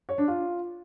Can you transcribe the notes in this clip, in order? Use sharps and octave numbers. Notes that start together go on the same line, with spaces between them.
C#5
D4
F4